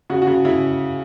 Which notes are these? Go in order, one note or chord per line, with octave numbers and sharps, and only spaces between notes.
C#3 F#4
F#4
C#3
C#3 E4